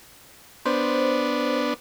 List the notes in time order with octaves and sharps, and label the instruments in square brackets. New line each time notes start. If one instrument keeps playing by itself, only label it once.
[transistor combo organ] B3 D4 [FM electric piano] C5